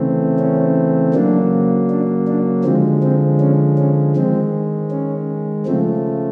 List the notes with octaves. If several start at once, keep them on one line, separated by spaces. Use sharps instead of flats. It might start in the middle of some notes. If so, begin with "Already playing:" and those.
Already playing: C#3 E3 A3 C4
C#4
C#3 F#3 A#3 D4
D4
D4
D3 F3 G#3 C4
C4
C#4
C#4
D#3 G#3 C4
C#4
C#3 F3 A3 C4